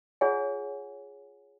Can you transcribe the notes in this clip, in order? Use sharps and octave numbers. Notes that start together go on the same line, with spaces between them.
F4 G#4 C#5 F#5 G#5